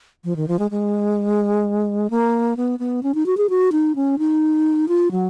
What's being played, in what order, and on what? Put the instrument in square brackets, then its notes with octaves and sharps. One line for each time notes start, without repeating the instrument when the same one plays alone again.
[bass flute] F3
D#3
F3
G#3
G#3
A#3
B3
B3
C#4
D#4
F#4
G#4
F#4
D#4
C#4
D#4
F4
F#3